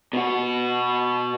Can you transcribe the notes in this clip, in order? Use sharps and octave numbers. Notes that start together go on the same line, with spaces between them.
B2 F#4